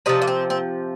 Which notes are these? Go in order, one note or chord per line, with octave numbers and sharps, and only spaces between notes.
C3 F3 D#4
A#3
C4
C4